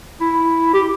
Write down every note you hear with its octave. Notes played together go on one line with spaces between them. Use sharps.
E4
G4